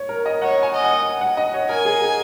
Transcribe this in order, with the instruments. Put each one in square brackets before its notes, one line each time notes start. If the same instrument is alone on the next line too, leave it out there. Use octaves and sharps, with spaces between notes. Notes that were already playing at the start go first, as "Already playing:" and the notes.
Already playing: [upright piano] C#5
A#4
D#5
[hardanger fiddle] C#5 [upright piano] F#5
[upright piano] G#5
[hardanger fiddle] D#5
[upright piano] F#5
F#5
D#5
C#5
[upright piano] A#4 [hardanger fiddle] G#5
[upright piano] G#4
G#4